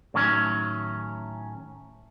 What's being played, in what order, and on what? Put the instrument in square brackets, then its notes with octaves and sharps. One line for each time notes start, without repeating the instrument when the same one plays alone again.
[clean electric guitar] A2 D#3 F#3 C#4